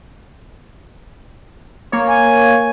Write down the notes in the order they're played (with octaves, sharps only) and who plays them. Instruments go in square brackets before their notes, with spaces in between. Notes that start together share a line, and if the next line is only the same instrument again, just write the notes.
[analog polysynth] A#3 C#5
[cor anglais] G#5